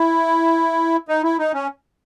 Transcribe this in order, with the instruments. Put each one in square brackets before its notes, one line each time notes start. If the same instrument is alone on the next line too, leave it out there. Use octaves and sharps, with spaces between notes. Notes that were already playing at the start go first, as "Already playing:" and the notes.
Already playing: [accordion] E4
D#4
E4
D#4
C#4